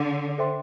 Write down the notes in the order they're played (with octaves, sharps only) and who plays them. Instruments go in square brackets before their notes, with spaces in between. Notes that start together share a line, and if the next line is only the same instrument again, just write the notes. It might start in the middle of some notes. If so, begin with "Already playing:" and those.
Already playing: [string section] D3
[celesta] A4 C5 E5 G5 C6